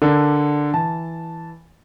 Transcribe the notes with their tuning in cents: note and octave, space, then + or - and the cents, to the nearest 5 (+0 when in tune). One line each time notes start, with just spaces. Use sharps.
D3 +0 A#4 +0
E3 +0 A5 -5